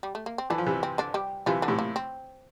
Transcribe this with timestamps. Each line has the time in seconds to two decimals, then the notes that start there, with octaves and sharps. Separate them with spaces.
0.03 G3
0.15 A3
0.26 A#3
0.38 C4
0.50 D3 E3 D4
0.58 F3
0.66 C3 E3
0.83 C4
0.98 D3 D4
1.14 G3 G4
1.46 C3 E3 F3 F4
1.62 D3 D4
1.68 A2 C3
1.79 A#3
1.96 C4